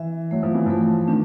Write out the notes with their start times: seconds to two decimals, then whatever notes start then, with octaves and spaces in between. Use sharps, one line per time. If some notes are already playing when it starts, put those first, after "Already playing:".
Already playing: E3 E5
0.31 F#3 A3
0.43 F3
0.55 E3
0.66 F3 A3
1.08 D#3 D4